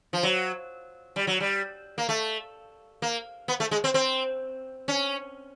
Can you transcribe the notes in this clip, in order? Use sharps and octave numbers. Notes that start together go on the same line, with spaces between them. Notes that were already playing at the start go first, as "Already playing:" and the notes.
F3
F#3
G3
F#3
G3
A#3
A3
A#3
B3
A3
G#3
C4
C4
C#4